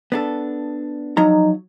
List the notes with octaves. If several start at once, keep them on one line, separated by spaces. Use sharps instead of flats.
B3 D4 A4
F3 F#3 D#4 A#5